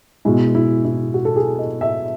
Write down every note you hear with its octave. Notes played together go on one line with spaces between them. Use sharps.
B2 G#3 E4
E4
E4
F#4
A4
G#4
D#5
E5